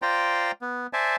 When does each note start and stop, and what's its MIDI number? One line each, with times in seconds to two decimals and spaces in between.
0.02 0.51 65
0.02 0.51 72
0.02 0.51 74
0.02 0.51 79
0.02 0.51 82
0.62 0.87 59
0.93 1.16 72
0.93 1.16 74
0.93 1.16 76
0.93 1.16 80
0.93 1.16 81